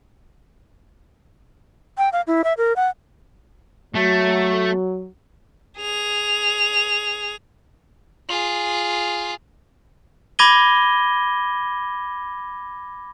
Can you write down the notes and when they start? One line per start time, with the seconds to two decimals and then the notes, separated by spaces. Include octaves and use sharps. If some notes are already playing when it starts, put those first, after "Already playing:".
1.98 G5
2.13 F5
2.27 E4
2.44 E5
2.58 A#4
2.76 F#5
3.94 F#3 A3
5.79 G#4 F7
8.29 F4 G#4
10.39 B5 D6 G#6 A#6 D#7 G7